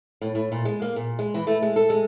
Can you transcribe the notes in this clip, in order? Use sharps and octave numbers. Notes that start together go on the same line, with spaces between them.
A2
A2
A#2
G#3
A#3
A#2
G#3
E3
A3
G#3
A4
G#3